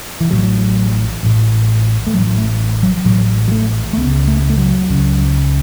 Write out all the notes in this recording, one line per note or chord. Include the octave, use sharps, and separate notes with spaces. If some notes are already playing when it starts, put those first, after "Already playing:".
E3
A1 A2 F#3
A1 A2
A3
A1 A2 F#3
A3
F#3
A1 A2 F#3
F#3
A3
A3
C#2 C#3 B3
A3
A3
F#3
C#2 C#3